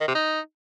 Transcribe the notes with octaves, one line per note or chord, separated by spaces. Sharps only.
D#3
C3
D#4